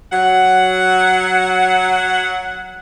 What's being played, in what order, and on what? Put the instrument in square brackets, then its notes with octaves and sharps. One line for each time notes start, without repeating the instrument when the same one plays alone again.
[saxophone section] F#3 F#5